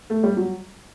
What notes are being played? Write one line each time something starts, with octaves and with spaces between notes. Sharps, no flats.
A3
G3
F#3